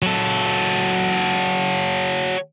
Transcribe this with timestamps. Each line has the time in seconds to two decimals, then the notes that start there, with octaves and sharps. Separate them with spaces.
0.02 F#3 A4